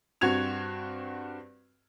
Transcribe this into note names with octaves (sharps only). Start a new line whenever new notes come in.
G2 C4 F#4 G#6 F7